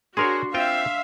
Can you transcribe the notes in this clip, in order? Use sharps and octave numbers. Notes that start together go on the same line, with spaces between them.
D4 F#4 G#4 A#4 C#5 C6
C4 F4 E5 F5 G5